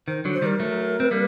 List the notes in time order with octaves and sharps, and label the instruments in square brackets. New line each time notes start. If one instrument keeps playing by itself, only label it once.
[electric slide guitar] D#3 [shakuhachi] C5
[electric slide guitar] D3 F#3
[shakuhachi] C5
[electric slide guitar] D#3 G3 [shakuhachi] A#4
[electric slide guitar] F#3 A3
C4
G3 A#3